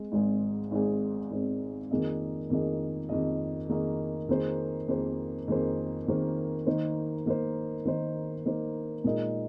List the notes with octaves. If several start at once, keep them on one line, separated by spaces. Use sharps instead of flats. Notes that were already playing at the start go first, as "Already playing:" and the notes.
Already playing: G#3 C4
G#1 G#2 G#3 C4 G#4
G#1 G#2 G#3 C4 G#4
G#1 G#2 G#3 C4 G#4
F2 D#3 A#3 G#4 D#5
F2 D#3 A#3 G#4 D#5
F2 D#3 A#3 G#4 D#5
F2 D#3 A#3 G#4 D#5
F2 D#3 A#3 G#4 C5
F2 D#3 A#3 G#4 C5
F2 D#3 A#3 G#4 C5
F2 D#3 A#3 G#4 C5
D#3 A#3 D#4 C5
D#3 A#3 D#4 C5
D#3 A#3 D#4 C5
D#3 A#3 D#4 C5
A#2 G#3 D#4 A#4 D#5